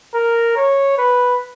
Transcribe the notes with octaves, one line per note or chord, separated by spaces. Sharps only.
A#4
C#5
B4